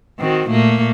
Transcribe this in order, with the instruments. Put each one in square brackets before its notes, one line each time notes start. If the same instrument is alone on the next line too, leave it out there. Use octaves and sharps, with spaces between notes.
[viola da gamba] D#3 C4 F#4
A#2 A3 A#3